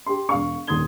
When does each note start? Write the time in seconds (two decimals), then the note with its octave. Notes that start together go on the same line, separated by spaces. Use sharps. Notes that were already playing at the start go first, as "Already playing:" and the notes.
0.06 G4 C6
0.29 E1 F5 C#6
0.67 D#1 D#2 C6 D#6 G#6 G7